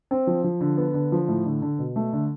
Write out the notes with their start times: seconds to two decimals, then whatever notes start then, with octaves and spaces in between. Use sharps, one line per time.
0.11 C4
0.27 F3
0.44 F3
0.61 D3
0.77 B3
0.94 D3
1.12 F3
1.28 A2
1.45 D3
1.62 D3
1.79 B2
1.96 A3
2.13 D3